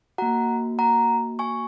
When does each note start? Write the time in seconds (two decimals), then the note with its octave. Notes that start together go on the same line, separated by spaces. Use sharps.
0.18 A#3 F#4 F#5 A#5
0.79 F#5 A#5
1.39 G#5 C#6